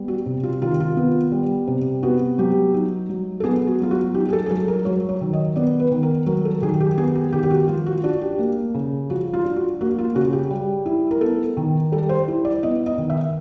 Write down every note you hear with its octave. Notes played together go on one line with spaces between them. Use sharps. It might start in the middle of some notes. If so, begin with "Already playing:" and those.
Already playing: G3 B3
F#4
C3
F4
D#3 F4
F4
B3
G3
C3
B3 F#4
F#3 G4
D#4
F#3
A4
B3 G#4
F#4
F#3 F4
F#4
D#4 G4
G#4
A4
G#4
F#3 A4
A#4
F#3 C#5
C#5
D#3
D#5
B3 D5
B4
D#3
A#4
F#3 A#4
A4
D#3 G#4
G4
B3 G#4
G4
D#3 G4
G4
F#4
F3 F4
F#4
D4 F#4
G4
A#3
C#3
F3 F#4
F4
D4
F#4
A#3 F#4
F4
C#3 F#4
G4
G3
E4
A#4
B3 A4
D#3
G3 A4
C5
E4
D5
B3 D#5
D#5
D#3
E5